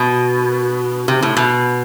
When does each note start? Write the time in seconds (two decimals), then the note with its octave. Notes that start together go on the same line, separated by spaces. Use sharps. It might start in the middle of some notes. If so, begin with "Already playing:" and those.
Already playing: B2
1.08 C3
1.22 A2
1.37 B2